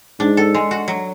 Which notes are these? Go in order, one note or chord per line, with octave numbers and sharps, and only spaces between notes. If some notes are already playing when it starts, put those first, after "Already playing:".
G#2 D4
A4
G#3
F#4
F#3